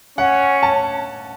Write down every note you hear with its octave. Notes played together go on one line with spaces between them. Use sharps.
C#4 F#5
A5